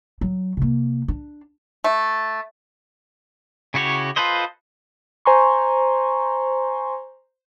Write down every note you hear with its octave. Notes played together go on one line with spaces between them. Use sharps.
F#3
C3 A#3
D4
A3
C#3 E4 F#4 G4 C#5
F4 A4 B4 C5 D#5
C5 G#5 A#5 C6 C#6